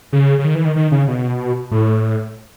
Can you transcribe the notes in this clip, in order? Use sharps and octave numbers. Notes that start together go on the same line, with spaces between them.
C#3
C#3
D#3
E3
D#3
D#3
C#3
B2
A2